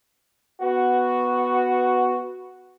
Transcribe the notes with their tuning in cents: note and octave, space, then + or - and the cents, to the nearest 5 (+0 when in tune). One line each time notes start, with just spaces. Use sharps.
B3 +0 F#4 +0